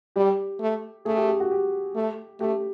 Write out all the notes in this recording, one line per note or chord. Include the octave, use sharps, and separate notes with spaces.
G3 G4
A3
A3 G#4
G4
G4
F#4
G4
A3
A3 G4